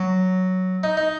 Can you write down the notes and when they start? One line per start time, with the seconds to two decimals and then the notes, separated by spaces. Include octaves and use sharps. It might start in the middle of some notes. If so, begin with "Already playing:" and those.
Already playing: F#3
0.83 D#4
0.97 D#4